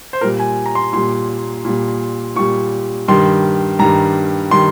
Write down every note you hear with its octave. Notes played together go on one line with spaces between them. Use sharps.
C5
A#2 G3 A#4
G#5
A#5
C6
A#2 G3 C6
A#2 G3
A#2 G3 C#6
G2 D#3 G3 C6
G2 D#3 G3 A#5
D#3 G3 C6